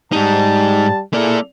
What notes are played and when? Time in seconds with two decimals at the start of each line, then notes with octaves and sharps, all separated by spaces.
0.12 G#2 G3 D#4 A5
1.14 A#3 E4 G#4 A4 D5